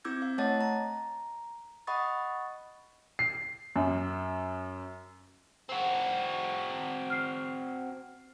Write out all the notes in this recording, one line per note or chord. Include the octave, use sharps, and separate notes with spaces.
C4 E4 D6 E6 G6 G#6
F5
A3 C#5 D#5 F#5 A5 A6
A#5
D#5 F#5 B5 C#6 D#6 A6
C7
F#2
C4 F#4
F6 C7